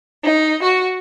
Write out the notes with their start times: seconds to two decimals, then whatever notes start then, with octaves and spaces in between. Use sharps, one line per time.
0.24 D#4
0.61 F#4